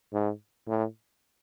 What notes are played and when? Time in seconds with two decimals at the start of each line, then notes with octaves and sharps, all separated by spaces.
0.13 G#2
0.68 A2